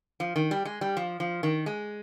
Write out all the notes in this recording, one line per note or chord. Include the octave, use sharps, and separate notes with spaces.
F3
D#3
G3
G#3
G3
F3
F3
D#3
G#3